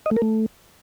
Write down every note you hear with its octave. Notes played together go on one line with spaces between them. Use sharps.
D#5
A3
A#4
A3